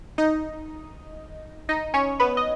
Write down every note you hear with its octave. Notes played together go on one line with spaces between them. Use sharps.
D#4 D#5
D#4 D#5
C#4 C#5
B3 B4
D#5